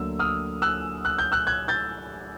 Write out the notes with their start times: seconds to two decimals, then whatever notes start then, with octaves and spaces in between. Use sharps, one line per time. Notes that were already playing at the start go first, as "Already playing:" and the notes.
Already playing: D2 D3 F#3 A#3 E6
0.19 D#6 F6
0.62 E6 F#6
1.05 F#6
1.18 G6
1.32 E6 F#6
1.47 F#6 G#6
1.68 G6 A6